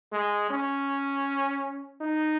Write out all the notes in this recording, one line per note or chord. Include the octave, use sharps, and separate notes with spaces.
G#3
C#4
D#4